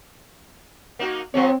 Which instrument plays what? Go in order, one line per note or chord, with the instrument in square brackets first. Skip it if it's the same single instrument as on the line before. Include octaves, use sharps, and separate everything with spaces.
[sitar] A#3 D#4 F#4
[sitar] F3 G#3 C#5 [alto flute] C4